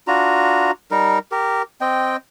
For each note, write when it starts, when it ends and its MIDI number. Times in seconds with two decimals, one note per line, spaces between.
0.07 0.71 62
0.07 0.71 65
0.07 0.71 66
0.07 0.71 82
0.91 1.19 55
0.91 1.19 63
0.91 1.19 70
1.31 1.62 67
1.31 1.62 70
1.81 2.17 60
1.81 2.17 75
1.81 2.17 79